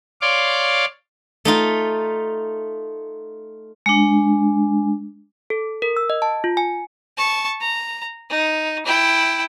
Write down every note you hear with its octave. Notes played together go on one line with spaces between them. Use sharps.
C#5 D5 F5 C6 D6
A3 D#4 F4
G#3 D4
A4
A#4
E6
D#5
A5
F4
G#5
A5 C#6
A#5
D#4
E4 G5